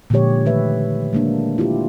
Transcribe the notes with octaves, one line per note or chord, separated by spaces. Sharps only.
A#2 D3 F3 G#3 G4 C#5
A#2 D#3 A3 B4 E5
G#3 A#3 D4
E4 F4 G4